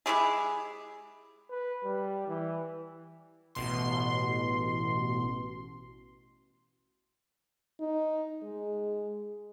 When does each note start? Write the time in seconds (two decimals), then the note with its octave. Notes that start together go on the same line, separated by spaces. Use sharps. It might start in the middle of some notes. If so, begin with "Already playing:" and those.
0.06 G#3 E4 G4 G#4
1.50 B4
1.84 G3
2.28 E3
3.55 A1 B2 C6
7.80 D#4
8.43 G#3